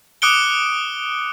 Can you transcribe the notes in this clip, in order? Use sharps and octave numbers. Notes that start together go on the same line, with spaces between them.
D6 D#6 F#6 C#7 D7 G7